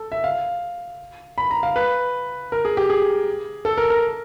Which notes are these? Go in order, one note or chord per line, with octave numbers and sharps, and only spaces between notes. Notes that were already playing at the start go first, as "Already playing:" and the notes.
Already playing: A4
E5
F5
B5
A#5
F5
B4
A#4
G#4
G4
G#4
A4
A#4
A#4